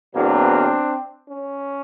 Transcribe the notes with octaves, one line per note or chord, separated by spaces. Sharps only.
E2 B2 F#3 A#3 C4 D4
C#4